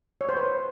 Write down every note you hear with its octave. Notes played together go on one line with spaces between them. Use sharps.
C#5
C5
B4